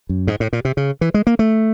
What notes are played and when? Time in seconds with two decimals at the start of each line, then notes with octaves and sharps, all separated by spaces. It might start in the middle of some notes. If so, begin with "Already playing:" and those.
0.09 F#2
0.27 G#2
0.40 A2
0.53 A#2
0.65 C3
0.77 C#3
1.01 E3
1.14 G#3
1.27 A#3
1.39 A3